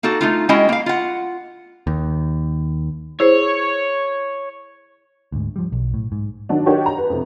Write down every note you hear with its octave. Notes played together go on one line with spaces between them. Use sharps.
A#3 D#4 F#4 A4
A3 D#4 F4
G#3 C#4 E4 F#4 D#5 G5
A#3 F5
F4 F#5
D#2
E4 G#4 C5 C#5
D2 G#2
F3 G3
B1
A2
G#2
D#3 F#3 D4
D4 D#4 F#4 G4 A#4 C#5
A#5
B4
F2 C3